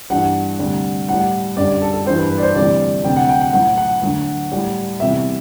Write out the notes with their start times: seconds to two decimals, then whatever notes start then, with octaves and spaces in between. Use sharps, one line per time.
0.10 G2 E3 G3 F#5
0.59 D2 C3 G3
1.08 A2 G3 F#5
1.57 F#2 D3 G3 D5
1.82 A4
1.93 A4
2.05 G2 E3 G3 C5
2.18 B4
2.31 B4
2.38 D5
2.43 C5
2.55 D2 C3 E3 G3 D5
3.04 D2 C3 F#3 G5
3.16 F#5
3.29 G5
3.41 F#5
3.53 A2 F#3 F#5
3.77 F#5
4.02 D2 D3 F#3
4.52 A2 G3
5.00 E2 C3 E3 G3 E5